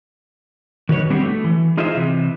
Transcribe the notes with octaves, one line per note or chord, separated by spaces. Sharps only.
D#3 F#4 B4 C#5
G3 B3 C4 D4 F#4 G4
A3
E3
D#4 F4 G#4 C5 D#5 E5
C3 E3